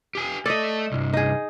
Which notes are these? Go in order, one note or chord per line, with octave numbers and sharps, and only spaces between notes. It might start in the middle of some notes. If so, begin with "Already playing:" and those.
G4 G#5
A3 A4 D5 D#5
C2 G2
D#4 G#4